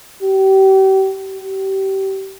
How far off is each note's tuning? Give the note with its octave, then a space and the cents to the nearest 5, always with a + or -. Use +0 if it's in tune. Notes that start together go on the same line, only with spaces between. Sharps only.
G4 -35
G4 -30